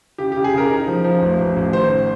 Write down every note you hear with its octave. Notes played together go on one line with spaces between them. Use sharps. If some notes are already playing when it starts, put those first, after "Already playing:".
C#3 G4
G4
C#3
G#4
C#3 A#4
D#4
F3
F3
A1
A1
A1
D#3 C5